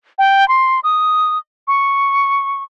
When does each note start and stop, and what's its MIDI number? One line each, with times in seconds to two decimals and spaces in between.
0.18 0.47 79
0.48 0.80 84
0.84 1.38 87
1.68 2.63 85